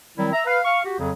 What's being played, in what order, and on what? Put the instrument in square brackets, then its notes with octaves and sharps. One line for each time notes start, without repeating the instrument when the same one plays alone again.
[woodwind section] D#3 F#3 G3 C4 E4
E5 A#5
B4 F5
F5 C#6
F#4 G4
F2 C#3 F#3